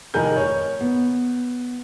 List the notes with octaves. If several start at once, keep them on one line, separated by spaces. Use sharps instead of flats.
F1 D#3 D#4 A#4 G#5 G6
C#5
B3